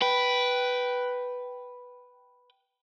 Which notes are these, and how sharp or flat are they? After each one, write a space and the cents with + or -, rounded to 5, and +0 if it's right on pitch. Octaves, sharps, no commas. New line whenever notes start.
B4 +0 G5 -15